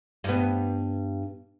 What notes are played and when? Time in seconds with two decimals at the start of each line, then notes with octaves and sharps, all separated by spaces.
0.24 G2 B3